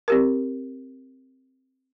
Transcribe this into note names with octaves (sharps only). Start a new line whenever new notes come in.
C4 G4 A#4